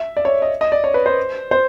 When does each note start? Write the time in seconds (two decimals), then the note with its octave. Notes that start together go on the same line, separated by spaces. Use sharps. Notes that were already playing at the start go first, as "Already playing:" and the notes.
Already playing: E5
0.17 D5
0.25 C#5
0.42 D#5
0.61 D#5
0.72 D5
0.84 C#5
0.94 B4
1.06 C5
1.51 C5